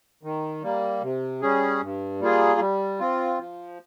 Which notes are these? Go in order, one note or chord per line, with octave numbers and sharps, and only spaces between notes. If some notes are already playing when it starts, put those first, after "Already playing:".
D#3
G3 A#3
C3
G3 C#4 G#4
G2
G3 A#3 F4 G#4
G3
C4 F4
F3